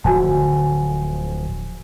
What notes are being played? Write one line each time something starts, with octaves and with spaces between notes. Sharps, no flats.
D1 D3 F3 F#4 G#5 A5